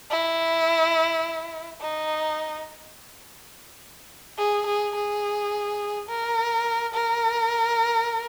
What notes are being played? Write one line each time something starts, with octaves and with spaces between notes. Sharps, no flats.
E4
D#4
G#4
G#4
G#4
A#4
A#4